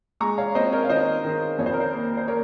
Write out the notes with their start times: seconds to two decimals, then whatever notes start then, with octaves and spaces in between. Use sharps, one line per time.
0.20 G#3 A#5 C#6
0.38 C#5 F5
0.55 C4 C5 D#5
0.72 A#4 C#5
0.84 F5
0.89 D#3 C5 D#5
1.25 D#3
1.58 F2 C#5
1.66 C5
1.73 A#4
1.80 C5
1.93 A#3
2.17 C5
2.28 A#3 A#4 C#5